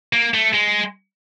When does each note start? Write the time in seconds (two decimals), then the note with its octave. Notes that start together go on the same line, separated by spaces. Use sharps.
0.13 A#3
0.34 A3
0.54 G#3